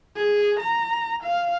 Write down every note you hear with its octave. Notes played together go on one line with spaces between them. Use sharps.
G#4
A#5
F5